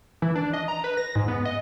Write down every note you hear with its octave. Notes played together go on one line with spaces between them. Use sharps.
E3
D4
D#5
A#5
B4
A#6
G#2
B3
D#5